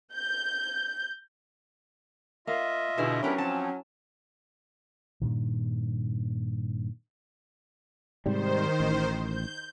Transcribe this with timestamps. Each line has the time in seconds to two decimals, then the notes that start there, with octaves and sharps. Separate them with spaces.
0.15 G6
2.47 A#3 F4 D#5 E5
2.98 B2 D3 E4 G#4
3.23 F#3 B3 C#4 D4 G4 A#4 B4 B5
3.38 F3 C4 A5
5.22 G2 A#2 D#3
8.26 G#2 C3 D#3 G3 C5
8.80 A1
9.20 G6